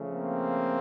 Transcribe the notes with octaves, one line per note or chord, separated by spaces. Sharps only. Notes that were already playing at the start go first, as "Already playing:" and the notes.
Already playing: C#3 F3 A3
A#3 C4